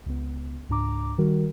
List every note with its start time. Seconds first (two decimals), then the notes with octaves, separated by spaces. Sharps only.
0.06 C#2 B3
0.69 C#2 G#2 D4 A#5 D6
1.18 D#3 G3 F#4 A#4